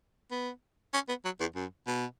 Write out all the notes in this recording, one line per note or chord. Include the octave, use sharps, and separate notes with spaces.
B3
C#4
B3
F#3
E2
F#2
B2